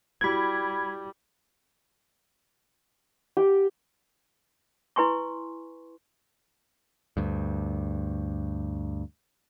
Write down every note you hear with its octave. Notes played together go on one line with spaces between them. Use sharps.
G3 E4 F#4 G4 B5 G#6
G4
E4 B4 G#5 C6 C#6
D2 G2